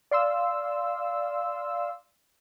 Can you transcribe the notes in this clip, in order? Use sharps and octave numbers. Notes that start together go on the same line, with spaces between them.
D5 F5 C6 E6